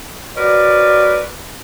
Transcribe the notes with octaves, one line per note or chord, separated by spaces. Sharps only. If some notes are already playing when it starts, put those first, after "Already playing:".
F#4 A#4 B4 C#5 D5